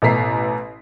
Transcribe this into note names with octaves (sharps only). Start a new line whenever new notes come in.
A1 B2 A4 A#5 B6 C7